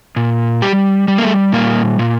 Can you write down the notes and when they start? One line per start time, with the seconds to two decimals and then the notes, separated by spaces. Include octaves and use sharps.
0.16 A#2
0.62 G3 G4
1.08 G3
1.18 A#3
1.23 A3
1.53 A#2 A#3
1.99 A#2